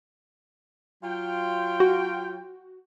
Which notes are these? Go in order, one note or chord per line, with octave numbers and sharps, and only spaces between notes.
F#3 F4 G5
F#4